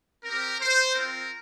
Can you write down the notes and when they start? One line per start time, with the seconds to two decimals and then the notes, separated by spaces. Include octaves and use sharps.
0.24 C4 G4 A#4
0.60 C5
0.95 C4 F4 A#4